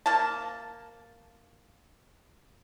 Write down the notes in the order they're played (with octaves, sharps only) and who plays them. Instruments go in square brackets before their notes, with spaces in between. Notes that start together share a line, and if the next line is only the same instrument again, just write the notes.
[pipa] A#3 A5